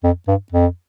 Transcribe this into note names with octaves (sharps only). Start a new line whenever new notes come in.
F2
G2
F2